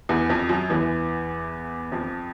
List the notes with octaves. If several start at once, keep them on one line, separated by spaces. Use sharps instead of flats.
E2 E3
F2 F3
F#2 F#3
E2 E3
F2 F3